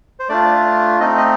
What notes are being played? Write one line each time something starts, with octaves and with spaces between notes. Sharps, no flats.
C5
A3 D4 F4 D5
A3 C4 D#4 D#5
D#5